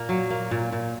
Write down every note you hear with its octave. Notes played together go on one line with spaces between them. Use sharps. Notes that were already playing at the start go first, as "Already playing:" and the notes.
Already playing: A#2 A#3
F#3
A#3
A#2
A#2